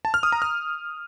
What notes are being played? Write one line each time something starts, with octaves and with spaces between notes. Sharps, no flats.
A5
F6
D#6
A#5
F6